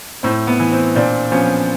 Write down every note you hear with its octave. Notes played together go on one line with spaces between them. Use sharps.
A2 C4
B3
E3
C4
A#2 C4 D4
F3 B3 C#4